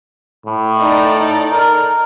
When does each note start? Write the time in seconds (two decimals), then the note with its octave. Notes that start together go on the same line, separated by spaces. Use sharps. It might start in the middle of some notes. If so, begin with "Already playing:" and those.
0.46 A2
0.78 D#4 A4 D5
1.52 A#4